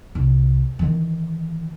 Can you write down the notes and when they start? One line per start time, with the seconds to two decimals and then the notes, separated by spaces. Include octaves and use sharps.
0.15 C2
0.79 D#3 E3